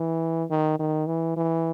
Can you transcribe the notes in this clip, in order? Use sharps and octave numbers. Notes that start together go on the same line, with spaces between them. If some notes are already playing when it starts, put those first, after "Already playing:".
Already playing: E3
D#3
D#3
E3
E3